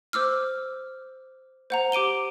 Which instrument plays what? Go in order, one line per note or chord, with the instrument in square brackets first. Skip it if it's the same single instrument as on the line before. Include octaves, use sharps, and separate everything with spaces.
[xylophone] C5 D6 E6 F6
C5 F#5 A#5
G4 D6 D7 D#7 G7